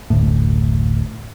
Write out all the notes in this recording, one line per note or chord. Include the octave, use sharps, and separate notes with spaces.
F#1 D2 A2